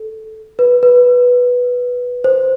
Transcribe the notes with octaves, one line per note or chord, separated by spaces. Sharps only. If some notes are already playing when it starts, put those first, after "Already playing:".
Already playing: A4
B4
B4
C5